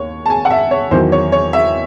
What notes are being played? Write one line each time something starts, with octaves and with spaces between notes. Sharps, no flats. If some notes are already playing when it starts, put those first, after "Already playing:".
Already playing: D#2 C#5
A5
G#5
F#5
E5
C#5
E2 D#3 F#3 C5
C#5
C#5
E5